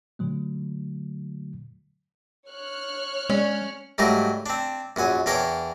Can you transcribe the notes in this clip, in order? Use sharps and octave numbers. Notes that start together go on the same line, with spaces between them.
A#2 D3 F#3 A3
C#5 F6 F#6
G#3 C#4
G#2 F#3 G3 A3 D#4 A#4
C4 D4
A#1 F#2 F#5 G#5
E2 D4 A#4 C#5 G5